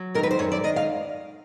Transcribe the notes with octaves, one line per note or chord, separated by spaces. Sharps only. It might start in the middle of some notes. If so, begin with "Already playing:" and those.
Already playing: F#3
D#3 A#4
B4
C5
F#2 C#5
D5
D#3 D#5
F5